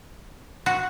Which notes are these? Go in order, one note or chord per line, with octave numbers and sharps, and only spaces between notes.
F#4